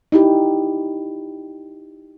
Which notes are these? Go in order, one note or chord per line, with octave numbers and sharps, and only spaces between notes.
D#4 E4 G4